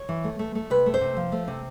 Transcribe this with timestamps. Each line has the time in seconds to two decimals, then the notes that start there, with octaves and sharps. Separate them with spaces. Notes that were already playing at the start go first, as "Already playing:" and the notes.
Already playing: C#5
0.09 E3
0.24 A3
0.39 A3
0.55 A3
0.70 C3 B4
0.86 A3
0.94 C5
1.01 C3
1.17 F3
1.32 A3
1.48 C3